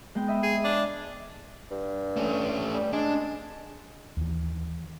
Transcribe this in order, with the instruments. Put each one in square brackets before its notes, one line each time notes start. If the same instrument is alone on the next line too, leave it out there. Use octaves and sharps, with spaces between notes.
[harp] G#3 B3 G5
D#5 E5 B5
[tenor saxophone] G#4
D4
[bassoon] G2
[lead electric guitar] A3 C#4
[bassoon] G3
[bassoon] G#3 [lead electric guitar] D4
[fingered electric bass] D#2 E3